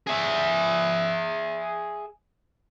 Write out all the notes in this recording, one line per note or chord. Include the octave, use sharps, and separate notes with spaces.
G#4 E5